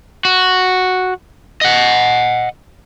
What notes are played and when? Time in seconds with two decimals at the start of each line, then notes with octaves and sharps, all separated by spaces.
0.25 F#4
1.61 D#5 F#5